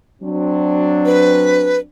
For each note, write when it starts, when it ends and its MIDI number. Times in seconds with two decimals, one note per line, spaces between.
0.22 1.86 54
0.22 1.86 60
0.22 1.86 62
1.05 1.79 71